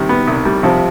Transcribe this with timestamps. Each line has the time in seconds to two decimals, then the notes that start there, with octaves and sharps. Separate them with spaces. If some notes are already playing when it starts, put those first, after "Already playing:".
Already playing: C2 C3 D#3 G3
0.09 B3
0.27 C2
0.45 G3
0.63 C3 F3